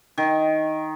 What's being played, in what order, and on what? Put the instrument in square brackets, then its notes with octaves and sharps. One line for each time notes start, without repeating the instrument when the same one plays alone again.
[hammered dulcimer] D#3